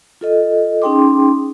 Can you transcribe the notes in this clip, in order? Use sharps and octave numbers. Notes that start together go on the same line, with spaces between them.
F4 A4 D#5
C#4 D#4 G#4 G5 C6 D6